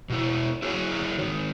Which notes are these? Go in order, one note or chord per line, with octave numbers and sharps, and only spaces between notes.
B2 E4
E4 F#4 G#4 C5 C#5
G#2 D#3